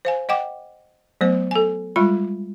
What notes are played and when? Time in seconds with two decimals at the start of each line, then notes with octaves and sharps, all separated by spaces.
0.05 C5 F5 G#5
0.29 D#5 F#5 G5 D6
1.21 F#3 A3 B3 C5
1.51 A4 G#5
1.96 G3 G#3 F4 B5